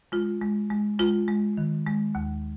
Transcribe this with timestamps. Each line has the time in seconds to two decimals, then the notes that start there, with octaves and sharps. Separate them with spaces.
0.12 G#3 F4
0.42 G#3
0.70 G#3
0.99 G#3 F4
1.28 G#3
1.57 D#3
1.86 G#3
2.15 D#2